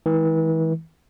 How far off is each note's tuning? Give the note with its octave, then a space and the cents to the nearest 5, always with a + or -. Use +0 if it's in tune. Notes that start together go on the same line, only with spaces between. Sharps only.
E3 -35 G#3 +25